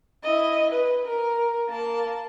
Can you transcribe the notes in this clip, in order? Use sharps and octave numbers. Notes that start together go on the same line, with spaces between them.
E4 D#5
B4
A#4
A#3 A5